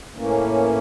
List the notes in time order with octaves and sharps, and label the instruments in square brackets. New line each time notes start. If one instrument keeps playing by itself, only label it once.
[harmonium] A2 E3 A#3 C#4